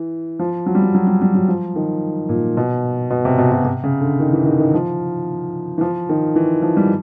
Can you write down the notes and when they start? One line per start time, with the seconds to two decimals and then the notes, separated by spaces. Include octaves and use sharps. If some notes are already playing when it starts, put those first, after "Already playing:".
Already playing: E3
0.39 F3
0.66 F#3
0.75 G3
0.82 F#3
0.95 F#3
1.07 G3
1.22 G3
1.35 F#3
1.48 F3
1.76 D#3
2.29 A#2
2.57 B2
3.10 B2
3.25 C3
3.38 B2
3.52 B2
3.65 C3
3.84 C#3
4.01 D3
4.20 D#3
4.33 E3
4.46 D#3
4.59 D#3
4.74 F3
5.78 E3
5.81 F3
6.09 D#3
6.36 E3
6.62 F3
6.77 G3